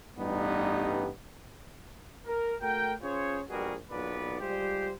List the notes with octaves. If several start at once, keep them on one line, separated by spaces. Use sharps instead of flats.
A1 G2 G3 B3 D#4
A#4
A3 F#4 A#4 G5
C#4 F4 G#4 C5 C#5
A#1 B2 G3 F#4 G#4 A#4
B1 G2 A#2 B3 B4 D5
G3 G#3 F4 G4 C5